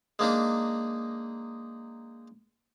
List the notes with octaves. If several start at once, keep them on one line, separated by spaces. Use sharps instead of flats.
G#3 A#3 D4 D#4